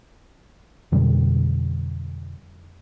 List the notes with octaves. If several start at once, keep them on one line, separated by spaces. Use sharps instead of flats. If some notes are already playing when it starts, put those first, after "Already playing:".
F2 B2 D3 G3